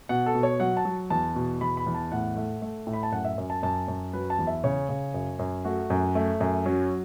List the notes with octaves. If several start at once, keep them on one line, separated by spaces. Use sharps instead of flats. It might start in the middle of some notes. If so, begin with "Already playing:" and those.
B2 F#5
A4
B2
C#5
F#3 F#5
A5
F#3
E2 A5
B2
E2 B5
B5
E2
A5
A2 F#5
A3
A3
A2
B5
A5
F#2 F#5
E5
F#2
A5
F#2 A5
F#2
F#3 B4
A5
E2
E5
C#3 C#5
C#3
F#2
F#2
A3 F#4
F#2
A3
F#2
F#3 C#4